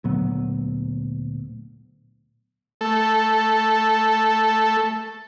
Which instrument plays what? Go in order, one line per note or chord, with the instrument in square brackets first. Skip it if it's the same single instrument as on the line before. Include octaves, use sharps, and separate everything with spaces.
[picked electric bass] D2 A#2 F#3 B3
[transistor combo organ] A3 A4